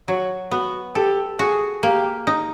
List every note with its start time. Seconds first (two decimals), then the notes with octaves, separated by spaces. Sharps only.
0.08 F#3 F#4
0.51 B3 F#4
0.95 G4 A4
1.39 F#4 G#4
1.83 A#3 G4
2.27 D#4